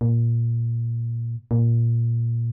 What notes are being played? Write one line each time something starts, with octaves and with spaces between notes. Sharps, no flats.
A#2
A#2